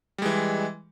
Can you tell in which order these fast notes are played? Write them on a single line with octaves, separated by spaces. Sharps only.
G3 G#3 E3